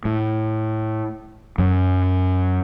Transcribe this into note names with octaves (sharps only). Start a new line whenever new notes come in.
A2
F#2 F#3